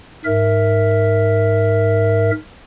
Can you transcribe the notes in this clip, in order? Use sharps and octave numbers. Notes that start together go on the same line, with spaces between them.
G#2 A#4 E5